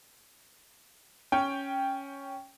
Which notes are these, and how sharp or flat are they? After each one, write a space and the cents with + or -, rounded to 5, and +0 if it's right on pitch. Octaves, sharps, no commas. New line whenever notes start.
C#4 +0 G5 +0